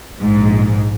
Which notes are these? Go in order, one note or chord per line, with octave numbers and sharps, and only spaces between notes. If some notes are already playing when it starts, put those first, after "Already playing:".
A#1 G#2